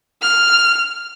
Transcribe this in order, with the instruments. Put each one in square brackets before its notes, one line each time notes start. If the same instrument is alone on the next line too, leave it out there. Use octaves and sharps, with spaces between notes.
[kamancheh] F6